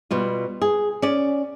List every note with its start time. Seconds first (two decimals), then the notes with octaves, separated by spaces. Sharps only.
0.11 B2 G3 F4
0.62 G#4
1.02 C#4 D5